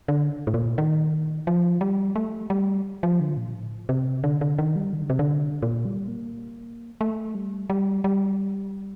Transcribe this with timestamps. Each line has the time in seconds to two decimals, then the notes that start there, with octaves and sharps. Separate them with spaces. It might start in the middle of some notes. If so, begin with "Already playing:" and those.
0.08 D3
0.47 A2
0.54 A#2
0.78 D#3
1.47 F3
1.81 G3
2.16 A3
2.50 G3
3.03 F3
3.20 D3
3.37 A#2
3.54 A2
3.89 C3
4.24 D3
4.41 D3
4.58 D#3
4.76 G3
4.93 D#3
5.01 D3
5.10 C3
5.19 D3
5.62 A#2
5.85 G3
6.08 A#3
7.01 A3
7.35 G3
7.70 G3
8.04 G3